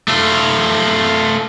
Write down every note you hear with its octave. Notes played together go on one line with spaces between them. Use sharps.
A3 F4